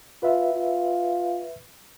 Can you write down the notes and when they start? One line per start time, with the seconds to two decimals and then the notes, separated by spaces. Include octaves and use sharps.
0.23 F4 B4 E5
0.54 F4